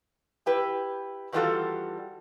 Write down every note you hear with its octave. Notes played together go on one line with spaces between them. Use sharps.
E4 G4 B4
D#3 E3 G3 F4 F#4 A4